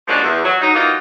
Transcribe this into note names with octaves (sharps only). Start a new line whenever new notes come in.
F3 F#3 G#3 A#3 C#4 D4
E2
F#3
F#3 D#4
E3 F#3 A#3 D#4 F4